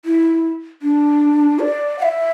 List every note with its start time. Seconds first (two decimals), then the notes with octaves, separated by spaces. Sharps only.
0.05 E4
0.82 D4
1.59 D5
1.99 F#5
2.02 E5